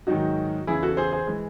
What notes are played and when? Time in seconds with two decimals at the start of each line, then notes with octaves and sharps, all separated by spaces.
0.07 G#2 D#3 F#3 D#4 F#4
0.67 E2 C#3 E3 E4 G#4
0.83 F#4 A4
0.97 G#4 C5
1.12 G#4 C5
1.27 E3 G#3